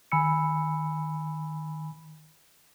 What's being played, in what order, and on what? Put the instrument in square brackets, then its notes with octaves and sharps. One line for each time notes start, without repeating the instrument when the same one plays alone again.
[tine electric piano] D#3 G#5 B5 E6 C#7